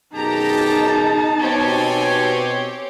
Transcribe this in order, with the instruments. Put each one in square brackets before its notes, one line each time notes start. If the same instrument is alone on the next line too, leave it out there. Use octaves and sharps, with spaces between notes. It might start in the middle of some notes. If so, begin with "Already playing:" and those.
[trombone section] F#2 B2 G#4 [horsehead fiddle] D#4 A5 [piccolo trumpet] G4 [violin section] A#5
[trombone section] B2 [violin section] C4 G4 C#5 [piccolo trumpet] G#5